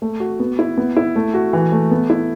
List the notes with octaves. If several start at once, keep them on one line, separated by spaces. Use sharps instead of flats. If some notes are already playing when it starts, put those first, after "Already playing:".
A3
F#4
B3
E4
B3
E4
A3
F#4
E3
A3
B3
E4